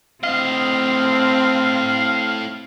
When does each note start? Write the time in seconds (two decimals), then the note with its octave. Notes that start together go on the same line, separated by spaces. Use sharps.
0.24 A2 C4 D#5 F5